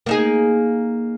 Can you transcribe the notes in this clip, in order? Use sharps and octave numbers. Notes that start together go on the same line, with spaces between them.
A#3 D#4 G#4